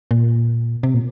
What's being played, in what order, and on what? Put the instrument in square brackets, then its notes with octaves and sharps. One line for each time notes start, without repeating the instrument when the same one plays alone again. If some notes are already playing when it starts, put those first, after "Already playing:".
[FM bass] A#2
C3
A#2